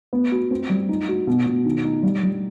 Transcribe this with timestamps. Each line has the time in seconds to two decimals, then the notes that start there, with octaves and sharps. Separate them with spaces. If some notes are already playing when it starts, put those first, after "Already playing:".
0.13 B3
0.32 F#4
0.51 C4
0.69 G3
0.89 D#4
1.09 F#4
1.27 B2
1.46 B2
1.65 D#3
1.84 D#4
2.03 G3
2.23 G3